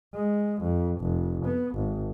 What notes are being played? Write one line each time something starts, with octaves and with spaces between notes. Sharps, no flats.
G#3
F2
F1
B3
G#1